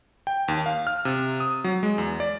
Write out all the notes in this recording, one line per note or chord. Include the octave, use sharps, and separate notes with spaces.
G5
D#2
F5
F6
C3
D#6
F#3
G#3
E2
D5